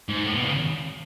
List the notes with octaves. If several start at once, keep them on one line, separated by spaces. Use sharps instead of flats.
G#2
A2
B2
C#3